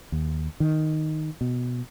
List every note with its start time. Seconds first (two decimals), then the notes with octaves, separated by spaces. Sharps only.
0.12 D#2
0.60 D#3
1.41 B2